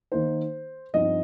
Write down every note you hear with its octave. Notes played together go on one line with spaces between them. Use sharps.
D#3 A#3 D#4 C5
G2 F3 C4 D#4 D#5